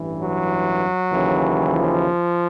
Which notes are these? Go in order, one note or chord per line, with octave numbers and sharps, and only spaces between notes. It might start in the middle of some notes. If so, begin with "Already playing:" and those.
Already playing: A1 G2 E3
F#3
D#2 C#3 E3
F3